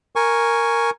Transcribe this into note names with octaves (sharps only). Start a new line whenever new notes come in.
A#4 G#5 C#6